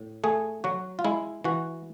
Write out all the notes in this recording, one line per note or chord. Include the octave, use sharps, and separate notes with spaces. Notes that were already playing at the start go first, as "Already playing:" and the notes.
Already playing: A2
A3 G#4
F#3 F#4
F4
G#3 E4
E3 F#4